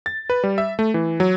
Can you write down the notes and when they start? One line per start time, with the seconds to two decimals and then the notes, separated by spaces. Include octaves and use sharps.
0.06 A6
0.30 B4
0.44 G3
0.58 E5
0.79 A3
0.94 E3
1.20 F#3